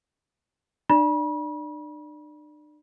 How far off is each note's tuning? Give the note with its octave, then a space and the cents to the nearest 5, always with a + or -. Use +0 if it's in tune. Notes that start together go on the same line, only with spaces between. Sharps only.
D4 +45 D5 +0 B5 -40